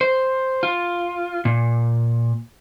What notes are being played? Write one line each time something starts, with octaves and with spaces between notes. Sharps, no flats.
C5
F4
A#2